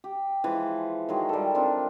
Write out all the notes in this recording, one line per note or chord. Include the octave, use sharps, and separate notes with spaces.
G4
E3 F3 G#3
D#3 F#3 G#3 G#4
G3 A4
C4 D4 F4 A#4